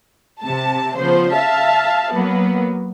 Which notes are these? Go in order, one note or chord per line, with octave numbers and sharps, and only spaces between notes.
C3 A5
C#3 F3 B3 C5
E5 F5 A5
F#3 A#3 B3